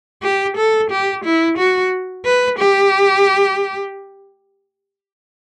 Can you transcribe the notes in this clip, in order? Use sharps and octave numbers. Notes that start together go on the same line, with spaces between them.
G4
A4
G4
E4
F#4
B4
G4